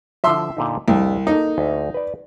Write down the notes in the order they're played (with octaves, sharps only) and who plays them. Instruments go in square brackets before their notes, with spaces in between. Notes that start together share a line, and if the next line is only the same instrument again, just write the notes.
[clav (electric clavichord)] D3 F3 [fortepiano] E5 C6 E6
[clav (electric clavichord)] A#2 D3 D#4
[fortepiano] C2 [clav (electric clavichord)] F2 D4 G4
[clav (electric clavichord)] A#3 A4 [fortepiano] D#4
[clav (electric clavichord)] D2 E5
B4 D5